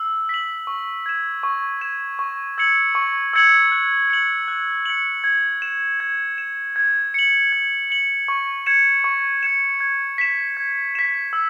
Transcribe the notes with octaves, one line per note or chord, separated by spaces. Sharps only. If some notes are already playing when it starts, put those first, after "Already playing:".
Already playing: E6
B6 F#7
C#6
G#6 E7
C#6
G#6 E7
C#6
E6 G#6 C#7 F#7
C#6
E6 G#6 C#7 F#7
F#6
C#7 F#7
F#6
C#7 F#7
G#6
E7
G#6
E7
G#6
C#7 F#7
G#6
C#7 F#7
C#6
G#6 C#7 E7
C#6
G#6 C#7 E7
G#6
B6 E7
G#6
B6 E7
E6